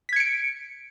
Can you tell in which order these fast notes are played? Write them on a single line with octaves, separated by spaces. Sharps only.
B6 G#6 C#7 D7